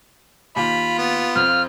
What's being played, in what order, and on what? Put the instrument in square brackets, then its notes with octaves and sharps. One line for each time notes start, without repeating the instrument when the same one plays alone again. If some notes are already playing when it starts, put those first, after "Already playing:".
[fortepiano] D#2 [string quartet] F4 [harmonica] B5
[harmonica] B3
[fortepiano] F2 [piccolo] F6